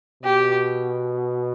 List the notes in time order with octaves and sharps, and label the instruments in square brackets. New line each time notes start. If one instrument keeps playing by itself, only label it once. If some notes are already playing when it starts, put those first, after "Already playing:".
[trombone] B2 [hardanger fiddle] G4